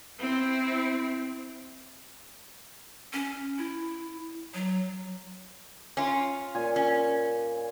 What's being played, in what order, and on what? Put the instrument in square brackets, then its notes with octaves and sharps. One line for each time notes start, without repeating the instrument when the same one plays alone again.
[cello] C4 E4
[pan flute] C#4
E4
F#3
[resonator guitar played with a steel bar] C#4 F4
[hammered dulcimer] A#2 G#5
[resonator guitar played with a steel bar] C#4